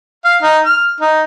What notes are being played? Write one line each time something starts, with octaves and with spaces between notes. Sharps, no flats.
F5
D#4
F6
D#4